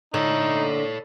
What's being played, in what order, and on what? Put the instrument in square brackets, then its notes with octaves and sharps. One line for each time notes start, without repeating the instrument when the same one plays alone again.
[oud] D3 [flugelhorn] D#4 [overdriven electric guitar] A4 C#5